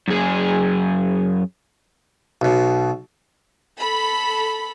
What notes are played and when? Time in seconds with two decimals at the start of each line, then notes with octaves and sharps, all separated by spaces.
0.08 F#2 G#4
2.41 B1 B2
3.80 A4 B5